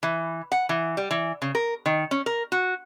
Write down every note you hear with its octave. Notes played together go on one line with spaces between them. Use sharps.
E3
F#5
E3
G3
E3
C#3
A#4
D#3
C#4
A#4
F#4